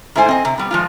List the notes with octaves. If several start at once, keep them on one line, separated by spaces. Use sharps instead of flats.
G#2 A3 E4 C5 G#5
C4 D#5
C3
G3 B3
F3 G#3 F4